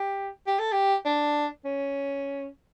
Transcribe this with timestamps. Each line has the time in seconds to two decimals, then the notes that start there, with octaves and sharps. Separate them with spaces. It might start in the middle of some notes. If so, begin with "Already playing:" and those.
Already playing: G4
0.47 G4
0.59 A4
0.72 G4
1.05 D4
1.65 C#4